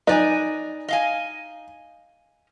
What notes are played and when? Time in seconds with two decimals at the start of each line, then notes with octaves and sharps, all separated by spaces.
0.07 D#4 B4 D5 G#5
0.88 D#5 F5 G#5